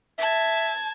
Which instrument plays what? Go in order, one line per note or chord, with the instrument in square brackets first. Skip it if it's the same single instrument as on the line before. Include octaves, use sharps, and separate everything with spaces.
[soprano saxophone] E5 [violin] A5 G#6